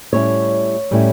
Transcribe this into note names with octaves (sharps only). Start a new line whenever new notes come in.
A2 G3 C#4 E4 C#5
A2 G3 C#4 E4